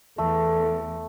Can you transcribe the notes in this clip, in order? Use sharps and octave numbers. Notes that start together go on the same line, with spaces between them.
E2 A3 A4